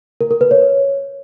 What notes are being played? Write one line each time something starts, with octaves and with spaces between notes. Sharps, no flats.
A#4
A#4
B4
C#5